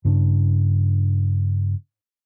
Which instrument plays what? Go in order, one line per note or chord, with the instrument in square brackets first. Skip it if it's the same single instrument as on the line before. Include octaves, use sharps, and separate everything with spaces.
[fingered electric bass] G2 C#3 D4